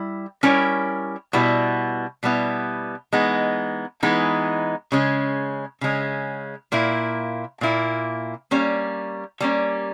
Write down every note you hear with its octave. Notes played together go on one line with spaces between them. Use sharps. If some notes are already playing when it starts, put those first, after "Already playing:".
Already playing: G3 E4
G3 C#4 E4 A#4 C#5
B2 G3 B3 E4
B2 G3 B3 E4
E3 G#3 B3 D#4
E3 G#3 B3 D#4
C#3 G#3 C#4
C#3 G#3 C#4
A#2 A#3 E4
A#2 A#3 E4
G3 A#3 C#4
G3 A#3 C#4